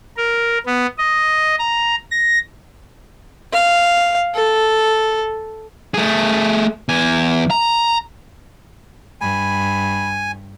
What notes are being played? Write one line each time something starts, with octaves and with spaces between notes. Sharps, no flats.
A#4
B3
D#5
A#5
A#6
F5
A4
A3 G#4
E2 G#5
A#5
G2 G#5 B5